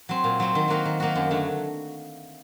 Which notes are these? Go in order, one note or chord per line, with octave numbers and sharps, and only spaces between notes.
F#3 C4
A#2
F#3 C4
D#3
F#3 A#3 D#4 F#4
D#3
F#3 A#3 D#4 F#4
F#2
D3 F#3 A3